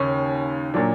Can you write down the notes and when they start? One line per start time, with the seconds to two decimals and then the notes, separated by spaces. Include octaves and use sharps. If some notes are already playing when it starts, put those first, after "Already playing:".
Already playing: D#2 C#3 C#4
0.74 A#2 F#3 D4